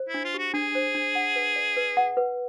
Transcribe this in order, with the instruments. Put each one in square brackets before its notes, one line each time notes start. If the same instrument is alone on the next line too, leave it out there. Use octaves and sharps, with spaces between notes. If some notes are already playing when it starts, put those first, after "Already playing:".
Already playing: [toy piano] C5
[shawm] E4
[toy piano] D4
[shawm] F4
[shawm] F#4 [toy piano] G4
[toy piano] D4 [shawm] G#4
[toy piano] C5
D4
F#5
B4
D5
B4
F#5
B4